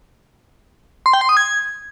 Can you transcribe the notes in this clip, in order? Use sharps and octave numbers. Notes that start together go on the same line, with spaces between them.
C6
G5
C6
D#6
G#6